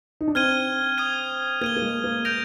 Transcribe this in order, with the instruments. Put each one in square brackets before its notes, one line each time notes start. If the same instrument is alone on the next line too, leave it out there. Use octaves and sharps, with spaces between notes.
[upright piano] D#4
D4
[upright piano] C4 [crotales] F6 G#6 D#7 G7
[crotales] D#6 G#6 D#7 G7
[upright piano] A#3 [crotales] G#6 D#7 G7
[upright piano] A#3
G#3
A#3
[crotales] G6 A#6 D7 F7